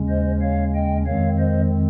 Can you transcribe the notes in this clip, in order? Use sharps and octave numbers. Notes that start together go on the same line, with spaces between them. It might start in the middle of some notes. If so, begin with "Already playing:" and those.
Already playing: D#2 C#3 G#3 C#4
C5 D#5
C#5 F5
D#5 G5
F2 D#3 G#3 C4 C#5 F5
C5 D#5